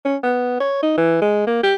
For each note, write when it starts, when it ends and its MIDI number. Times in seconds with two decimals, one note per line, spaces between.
0.05 0.16 61
0.23 0.58 59
0.60 0.82 73
0.82 0.96 63
0.98 1.20 52
1.22 1.43 56
1.47 1.62 58
1.63 1.75 67